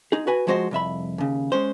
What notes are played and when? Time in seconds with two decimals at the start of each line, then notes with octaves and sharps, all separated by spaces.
0.12 D#4 G#4
0.27 F#4 B4 G#5
0.47 F3 G#3 F#4 C5 D#5
0.71 C2 F2 E5 B5
1.18 D#2 C#3
1.52 G#3 C#4 C5